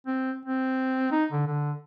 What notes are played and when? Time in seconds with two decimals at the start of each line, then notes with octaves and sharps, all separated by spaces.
0.07 C4
0.45 C4
1.11 D#4
1.32 D3
1.47 D3